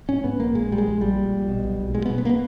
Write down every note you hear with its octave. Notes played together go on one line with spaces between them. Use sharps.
G#2 C#4
G#2 B3
A#1 A#3
A#2 G#3
A#1 G3
G#3
A#1
A#2 G3
A#2
A#1
B2
B1
B1
B2 G#3
B3
B2
B3
A#3
B3